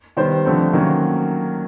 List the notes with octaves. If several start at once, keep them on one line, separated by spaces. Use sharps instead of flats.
D#3 G3 B3 C5
D3 F3 A3 C4
D#3 F#3 A#3 C#4